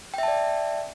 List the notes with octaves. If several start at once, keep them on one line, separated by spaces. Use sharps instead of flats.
D5 E5 G5 A5